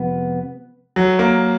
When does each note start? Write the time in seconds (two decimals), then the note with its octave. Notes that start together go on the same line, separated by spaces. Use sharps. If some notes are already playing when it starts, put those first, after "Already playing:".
Already playing: F2 C3 F3 G#3 B3
0.96 F#3
1.19 A#3